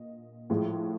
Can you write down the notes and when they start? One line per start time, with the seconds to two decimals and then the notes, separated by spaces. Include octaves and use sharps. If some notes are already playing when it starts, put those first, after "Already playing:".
Already playing: A#2 D#5
0.50 A2 F3 G#3